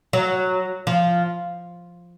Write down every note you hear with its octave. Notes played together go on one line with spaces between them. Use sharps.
F#3
F3